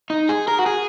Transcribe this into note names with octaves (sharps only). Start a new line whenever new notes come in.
D#4
G#4
A#4
F#4
G#4